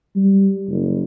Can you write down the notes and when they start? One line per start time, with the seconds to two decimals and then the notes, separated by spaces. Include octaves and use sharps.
0.16 G3
0.68 F#1